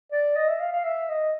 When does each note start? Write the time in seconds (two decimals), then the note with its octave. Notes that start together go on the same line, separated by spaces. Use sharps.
0.12 D5
0.36 D#5
0.48 E5
0.60 F5
0.72 F5
0.84 E5
1.09 D#5